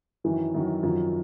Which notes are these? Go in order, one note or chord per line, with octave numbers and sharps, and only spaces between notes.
F#2 D#3 E3 F#3
F#2 D#3 F#3
F#2 D#3 F3 F#3